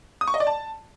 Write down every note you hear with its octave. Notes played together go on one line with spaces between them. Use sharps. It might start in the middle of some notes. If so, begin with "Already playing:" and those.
D#6
C#6
D#5
D5
A5